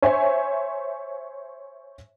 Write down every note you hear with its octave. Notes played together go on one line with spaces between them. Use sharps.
C5 C#5 E5 G#5